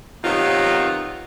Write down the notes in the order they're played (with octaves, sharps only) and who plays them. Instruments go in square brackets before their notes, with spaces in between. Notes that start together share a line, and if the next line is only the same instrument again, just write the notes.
[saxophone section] C3 D#3 F#3 B3 D#4 F4